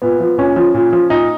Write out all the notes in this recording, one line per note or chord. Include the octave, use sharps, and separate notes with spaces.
A#2 B3
F3
A#2 C#4
F3
A#2
F3
A#2 D#4